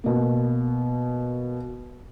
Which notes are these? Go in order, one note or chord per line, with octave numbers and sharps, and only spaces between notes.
B2 A#3